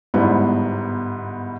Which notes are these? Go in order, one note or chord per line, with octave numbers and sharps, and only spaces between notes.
G1 G#2 G3 B3 E4 C5